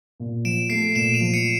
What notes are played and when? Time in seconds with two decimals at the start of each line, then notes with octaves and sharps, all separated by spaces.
0.20 A#2
0.44 F3 D7 E7
0.70 A3 C7 D7
0.95 A#2 D7 E7
1.14 D#7 F7
1.20 F3
1.33 C#7 D#7